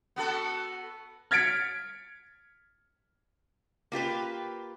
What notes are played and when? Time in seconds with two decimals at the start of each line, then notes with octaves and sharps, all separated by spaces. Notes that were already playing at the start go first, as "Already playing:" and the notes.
0.16 B3 F#4 A4
1.31 F6 G#6 A6 B6 C#7 D7
3.92 A#3 F4 G4 B4